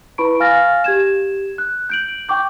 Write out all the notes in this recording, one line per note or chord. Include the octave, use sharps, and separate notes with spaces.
E4 B4 B5 C#6 D7
F5 G#5 F6 A6 A#6
G4 G#6 E7
F#6
G6 D7 F#7
G5 C#6 D6 G6